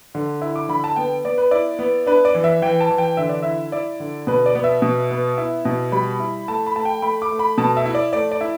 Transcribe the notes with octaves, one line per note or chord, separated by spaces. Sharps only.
D3
E4
D6
D3 B5
A5
B3 G5
B3 D5
B4
E4 D5
B3
D4 B4
D5
E3
E5
E3 G5
A5
E3
G5
D3 E5
D5
E4 E5
E4 D5
D3
B2 B4
D5
B3
E5
B2
B3
E4
B2
G3 B5
E4
A3 A5
B5
A3 A5
G5
A3 B5
D6
A3
B5
B2 A5
E5
E4
D5
A3 D5
D5
E4